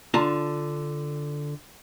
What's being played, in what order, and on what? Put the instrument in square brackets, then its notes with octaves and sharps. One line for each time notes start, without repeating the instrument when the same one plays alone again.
[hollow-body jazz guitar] D3 F4 A5 A#5